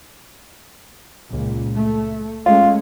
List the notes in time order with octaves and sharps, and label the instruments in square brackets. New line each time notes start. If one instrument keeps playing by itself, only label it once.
[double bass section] C#2 A#2
A3
[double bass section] G#3 A3 C#4 [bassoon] F4